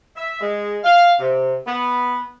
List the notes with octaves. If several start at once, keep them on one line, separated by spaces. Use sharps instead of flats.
E5
G#3
F5
C3
B3